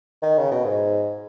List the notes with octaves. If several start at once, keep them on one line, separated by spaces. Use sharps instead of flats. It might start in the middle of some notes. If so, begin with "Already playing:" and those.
D#3
C#3
B2
G#2